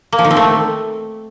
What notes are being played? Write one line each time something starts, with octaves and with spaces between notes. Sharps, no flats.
A#3
F3
D#3
C4
A3